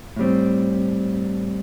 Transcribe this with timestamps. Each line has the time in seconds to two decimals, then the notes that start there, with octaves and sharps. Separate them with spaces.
0.16 A2 G3 C4